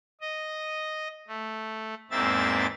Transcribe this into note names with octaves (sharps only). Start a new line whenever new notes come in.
D#5
A3
E2 G#2 A#3 C4 E5 A6